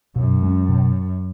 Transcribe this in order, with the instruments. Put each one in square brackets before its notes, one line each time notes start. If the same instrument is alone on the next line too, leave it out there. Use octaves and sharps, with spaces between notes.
[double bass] F#2 [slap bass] B2
[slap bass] G#3 C#4
B2